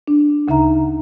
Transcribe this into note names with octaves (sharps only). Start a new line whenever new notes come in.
D4
D2 C#3 D#4 E5 A#5